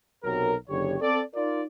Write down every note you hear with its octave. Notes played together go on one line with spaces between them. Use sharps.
B1 C3 F#3 A#4
F#1 F#2 D3 G4 C#5
C4 A4 D5
D#4 F4 A#4 D5